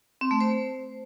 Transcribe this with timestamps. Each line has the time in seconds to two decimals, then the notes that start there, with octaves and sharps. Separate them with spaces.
0.21 C4
0.31 A3
0.41 C5